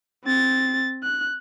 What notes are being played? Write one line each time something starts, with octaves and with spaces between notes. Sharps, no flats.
C4 A6
F#6